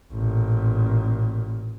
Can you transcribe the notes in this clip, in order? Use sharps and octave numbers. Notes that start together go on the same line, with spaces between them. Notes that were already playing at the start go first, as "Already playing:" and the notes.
A1 A#2